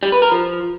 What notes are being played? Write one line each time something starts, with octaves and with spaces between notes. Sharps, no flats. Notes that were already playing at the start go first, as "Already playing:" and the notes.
G3
B4
A#4
F3